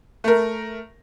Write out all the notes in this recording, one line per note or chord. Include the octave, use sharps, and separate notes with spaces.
A3 A#4